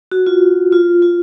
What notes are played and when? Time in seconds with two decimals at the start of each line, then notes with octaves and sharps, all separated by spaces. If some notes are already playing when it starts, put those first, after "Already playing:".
0.12 F#4
0.27 F4
0.72 F4
1.02 F4